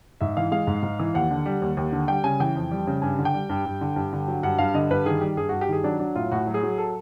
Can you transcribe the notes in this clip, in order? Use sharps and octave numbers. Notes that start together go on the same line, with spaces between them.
G#2 E5
E3 F5
G#3 F5
G#2
G#2
E3
D#2 F#5
D3
G3
D#2
D#2
D3
G3 G5
C#3 G#5
E3 G5
F2
G3
C#3
G2 G#5
D3
G5
G3
G2
G2
D3
G2
D3
F#3
G2 F#5
G2 F5
D3 D#5
G2 B4
D#3 G#4
G3 G4
G2 G#4
G2 F#4
G4
D#3 G#4
F#3 D4
F#3 D4
A2 F4
A2 F#4
F#3
G#4
F#3
A4